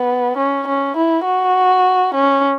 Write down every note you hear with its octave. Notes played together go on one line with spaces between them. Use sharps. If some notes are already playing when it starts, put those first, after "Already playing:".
Already playing: B3
C#4
C#4
E4
F#4
C#4